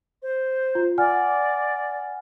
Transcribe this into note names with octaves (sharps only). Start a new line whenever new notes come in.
C5
F4
D5 F#5 G#5 F6